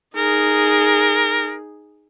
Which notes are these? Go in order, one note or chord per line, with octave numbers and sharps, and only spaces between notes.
D#4 G#4 A#4